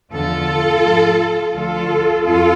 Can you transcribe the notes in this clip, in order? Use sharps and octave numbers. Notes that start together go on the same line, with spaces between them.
E2 D3 F3 F4 A4
G#2 F3
D2 D3 F3 F4 A4
F2 F4 A4